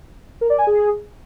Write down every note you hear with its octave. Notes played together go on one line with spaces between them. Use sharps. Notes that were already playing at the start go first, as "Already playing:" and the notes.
A#4
D5
G#5
G#4